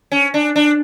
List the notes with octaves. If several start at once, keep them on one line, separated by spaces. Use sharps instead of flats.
C#4
D4
D4